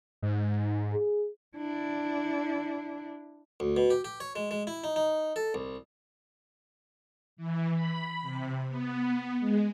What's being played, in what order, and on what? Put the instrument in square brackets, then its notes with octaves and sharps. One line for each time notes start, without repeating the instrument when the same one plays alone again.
[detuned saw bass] G#2
[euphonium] G#4
[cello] D4 E4
[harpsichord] D2
B2
G4
G4
C#5
G#3
G#3
E4
D#4
D#4
A4
C2
[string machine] E3
B5
C3
B3
G#3